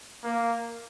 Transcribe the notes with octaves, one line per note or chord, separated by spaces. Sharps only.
A#3